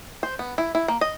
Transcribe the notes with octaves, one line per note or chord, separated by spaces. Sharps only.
C5
B3
E4
E4
A#3
D#5